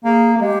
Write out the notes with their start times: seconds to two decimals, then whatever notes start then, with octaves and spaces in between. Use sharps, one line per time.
0.04 A#3 G#4
0.37 A#3
0.41 G#3 G4